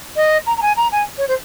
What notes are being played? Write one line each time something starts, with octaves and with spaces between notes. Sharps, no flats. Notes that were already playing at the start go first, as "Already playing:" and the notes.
D#5
A#5
A#5
G#5
A#5
G#5
C#5
C5